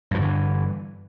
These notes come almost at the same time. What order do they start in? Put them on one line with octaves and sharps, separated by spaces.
G2 F3 D3 E3